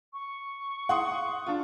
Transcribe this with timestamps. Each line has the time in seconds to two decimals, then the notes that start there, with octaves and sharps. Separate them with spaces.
0.13 C#6
0.89 F#5 C6 D#6
1.46 D4 F4